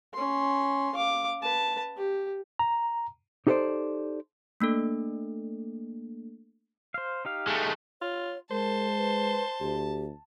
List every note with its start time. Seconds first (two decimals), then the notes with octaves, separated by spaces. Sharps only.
0.14 C#4 C6
0.95 F5 D6
1.42 B4 A5
1.97 G4
2.59 A#5
3.47 D#4 G4 A4 B4 C5 D5
4.61 A3 A#3 D4 A4
6.94 C5 F5
7.25 D#4 G4 F5
7.47 G#3 A3
8.01 F4 C#5
8.51 G#3 A#4 C5 A5
8.98 B4
9.60 D2 G4